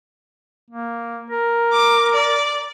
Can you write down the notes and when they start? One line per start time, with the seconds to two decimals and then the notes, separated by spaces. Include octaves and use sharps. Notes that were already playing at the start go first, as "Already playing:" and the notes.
0.71 A#3
1.30 A#4
1.72 D6
2.14 D5